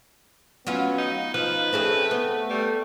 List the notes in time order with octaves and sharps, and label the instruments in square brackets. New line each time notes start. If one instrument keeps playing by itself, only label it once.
[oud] F#3 C#4 F4 [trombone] B3
[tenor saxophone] D#4
[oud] F3 [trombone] D#4 [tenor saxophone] B4
[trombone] A3 [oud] C4 C#4 G#4
[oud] B3
[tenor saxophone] G3 [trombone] A3